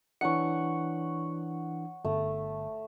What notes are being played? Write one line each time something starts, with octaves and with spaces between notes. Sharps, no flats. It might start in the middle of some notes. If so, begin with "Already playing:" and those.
E3 D4 C#5 F#5 C#7
G1 A3